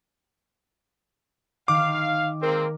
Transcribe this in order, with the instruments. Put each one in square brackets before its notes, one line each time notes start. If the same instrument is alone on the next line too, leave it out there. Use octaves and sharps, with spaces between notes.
[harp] D#3 [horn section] F5 [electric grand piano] D6
[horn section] G#3 A#3 C4 [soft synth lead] A#4